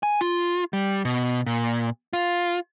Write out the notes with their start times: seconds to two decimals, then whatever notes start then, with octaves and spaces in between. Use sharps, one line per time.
0.03 G#5
0.21 F4
0.73 G3
1.05 B2
1.46 A#2
2.13 F4